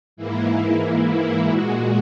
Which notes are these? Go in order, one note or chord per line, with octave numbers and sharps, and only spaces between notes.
G#2 E3 A#3 E4
A#2 G#3 F#4